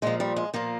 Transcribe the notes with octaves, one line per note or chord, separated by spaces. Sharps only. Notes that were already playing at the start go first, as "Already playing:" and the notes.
A#2 F3 G#3
G3
G#3
A#2 F3 A#3